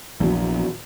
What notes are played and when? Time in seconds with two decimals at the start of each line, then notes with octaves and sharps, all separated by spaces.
0.20 A#1 E2 F#3